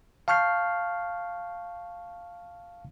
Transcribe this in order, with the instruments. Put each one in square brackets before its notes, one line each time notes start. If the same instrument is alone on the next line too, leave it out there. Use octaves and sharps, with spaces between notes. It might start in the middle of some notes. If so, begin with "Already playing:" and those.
[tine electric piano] F5 A5 C#6 F6 G6 C7